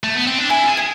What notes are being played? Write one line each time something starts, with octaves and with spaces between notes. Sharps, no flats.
A3
B3
C4
D4
E4 G#5
F4
G#4
G#5